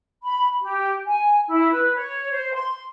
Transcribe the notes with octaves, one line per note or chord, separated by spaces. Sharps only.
B5
G4
G#5
E4
B4
C#5
C5
C6